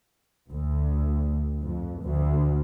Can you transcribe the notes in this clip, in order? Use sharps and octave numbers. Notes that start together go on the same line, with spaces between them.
D2
F2
D2